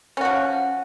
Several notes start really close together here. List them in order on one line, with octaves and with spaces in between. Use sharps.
C#4 F#4 F3